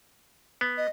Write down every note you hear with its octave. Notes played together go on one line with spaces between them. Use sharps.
B3
D#5